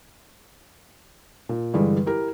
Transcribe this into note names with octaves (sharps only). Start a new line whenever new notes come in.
A#2
G2 D3 E3 G3 G#3
E4 G4 A#4